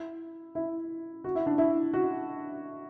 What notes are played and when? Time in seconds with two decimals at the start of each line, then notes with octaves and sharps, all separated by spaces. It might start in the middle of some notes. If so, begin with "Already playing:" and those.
Already playing: E4
0.55 E4
1.24 F#4
1.35 E4
1.46 D4
1.58 E4
1.94 F#4